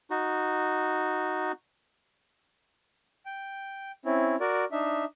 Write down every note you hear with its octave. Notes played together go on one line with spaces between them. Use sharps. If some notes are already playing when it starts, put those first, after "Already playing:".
D#4 F#4
G5
C4 C#4 E4
F#4 A#4 D5
D4 D#4 E5